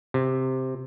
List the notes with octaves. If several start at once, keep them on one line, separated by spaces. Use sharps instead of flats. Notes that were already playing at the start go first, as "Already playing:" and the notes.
C3